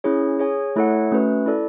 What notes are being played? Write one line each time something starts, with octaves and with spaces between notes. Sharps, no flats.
C#4 E4 G#4 C#5
G#4 C#5 G#5
A3 E4 A4 C#5 F#5
A3 C#4 F#4 B4
E4 A4 D5